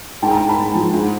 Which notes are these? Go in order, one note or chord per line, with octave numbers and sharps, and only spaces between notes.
G#2 G5 A5
G#5 A#5
G#2
A5 B5
G#3
F3
G#2